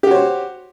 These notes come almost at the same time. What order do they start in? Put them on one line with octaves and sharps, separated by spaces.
G4 F#4 C#5 C5